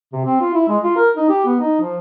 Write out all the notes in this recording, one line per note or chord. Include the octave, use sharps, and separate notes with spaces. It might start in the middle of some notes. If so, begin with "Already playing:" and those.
C3
C4
F4
E4
G#3
F4
A#4
D#4
G4
B3
D#4
F3